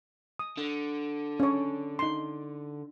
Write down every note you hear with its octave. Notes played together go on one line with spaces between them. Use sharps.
D#6
D3
C#4 C#5
D#4 C6